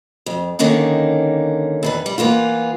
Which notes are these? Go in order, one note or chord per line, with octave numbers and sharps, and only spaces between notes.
F2
D3 D#3 A#3 C#4 D#4
E2 D#3 B4
G3
E3 A#3 B3 F4